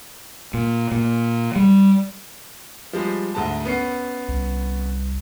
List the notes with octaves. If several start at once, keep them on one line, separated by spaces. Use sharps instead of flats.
A#2
A#2
G3
F3 G3 G#3
D2 G#2 A5
B3 C#4 C7
C2